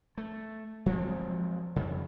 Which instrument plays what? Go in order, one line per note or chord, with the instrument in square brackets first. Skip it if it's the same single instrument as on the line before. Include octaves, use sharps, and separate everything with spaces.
[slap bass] A3
F3 F#3 G#3 C4
F2 C#3